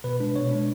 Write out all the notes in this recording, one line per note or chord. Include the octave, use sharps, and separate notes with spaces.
B2 B4
G#3 D4
B2 C#5
G#3 D4